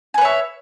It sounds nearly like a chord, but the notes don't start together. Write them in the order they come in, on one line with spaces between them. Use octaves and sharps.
G#5 B4 C#5 E5